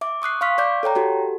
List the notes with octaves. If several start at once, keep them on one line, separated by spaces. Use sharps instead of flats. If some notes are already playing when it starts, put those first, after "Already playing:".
E5 D6
C#6 D#6 F#6 C7
F5 C6 C#6 F6 B6
D5 D6 G6
A4 C#5 G5 A#5
F#4 G4 A4